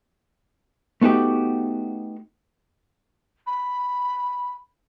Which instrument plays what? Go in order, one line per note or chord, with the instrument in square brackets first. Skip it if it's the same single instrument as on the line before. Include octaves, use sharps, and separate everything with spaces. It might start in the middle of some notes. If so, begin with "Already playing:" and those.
[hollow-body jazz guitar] A3 B3 D#4 F#4 G4
[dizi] B5